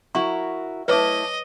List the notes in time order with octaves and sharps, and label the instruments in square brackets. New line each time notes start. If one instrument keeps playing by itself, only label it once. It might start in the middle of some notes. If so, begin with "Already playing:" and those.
[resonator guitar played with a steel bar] E4 F#4 A#4 [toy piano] C#6
[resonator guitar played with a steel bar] A3 E4 [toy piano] B4 C#5 D6 [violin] D#5